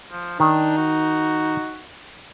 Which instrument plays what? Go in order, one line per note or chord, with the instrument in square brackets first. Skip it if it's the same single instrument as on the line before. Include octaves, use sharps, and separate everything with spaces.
[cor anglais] F3
[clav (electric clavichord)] D#3 [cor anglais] D4 [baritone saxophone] D#4
[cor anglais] F#4